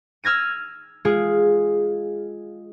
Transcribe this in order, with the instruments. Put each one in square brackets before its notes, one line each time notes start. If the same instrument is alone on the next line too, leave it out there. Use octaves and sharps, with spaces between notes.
[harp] E6 F6 G#6 A#6 D#7
G#3 F4 G#4